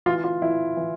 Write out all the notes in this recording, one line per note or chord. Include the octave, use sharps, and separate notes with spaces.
E3 F4
F4
E3 E4
E3